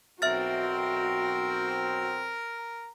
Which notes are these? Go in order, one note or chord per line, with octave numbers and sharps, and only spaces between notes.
B1 C4 F#4 A#4 E5 A#5 F6 A6